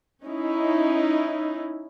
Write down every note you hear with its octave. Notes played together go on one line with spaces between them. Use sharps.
C#4 D#4 E4